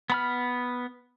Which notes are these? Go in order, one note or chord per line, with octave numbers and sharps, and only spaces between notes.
B3 B5 F6